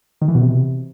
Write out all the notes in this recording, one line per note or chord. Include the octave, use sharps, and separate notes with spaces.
D#3
E3
B2
C3